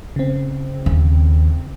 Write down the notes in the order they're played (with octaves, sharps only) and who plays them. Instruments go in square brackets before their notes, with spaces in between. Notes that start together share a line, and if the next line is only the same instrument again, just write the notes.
[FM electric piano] C#3 C4
[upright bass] D#2